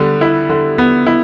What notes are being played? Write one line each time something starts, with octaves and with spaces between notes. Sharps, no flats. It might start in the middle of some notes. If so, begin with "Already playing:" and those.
Already playing: D3 G3 B3
E4
D3
B3
E4